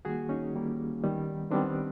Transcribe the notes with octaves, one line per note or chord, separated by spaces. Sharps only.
D#3 G3 A#3 F#4 G#4
C#4 D#4
D#3 G3 A#3
D#3 G3 B3
D#3 G3 B3 C4 D4